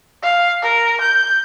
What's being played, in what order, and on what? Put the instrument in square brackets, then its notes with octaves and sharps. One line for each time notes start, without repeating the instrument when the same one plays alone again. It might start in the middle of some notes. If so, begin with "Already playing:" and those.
[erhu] F5
A#4
G6